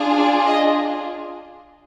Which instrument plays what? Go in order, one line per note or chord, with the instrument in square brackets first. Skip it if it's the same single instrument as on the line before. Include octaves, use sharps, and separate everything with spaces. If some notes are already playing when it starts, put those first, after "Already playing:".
Already playing: [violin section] D4 F4 G#4
D5
D#5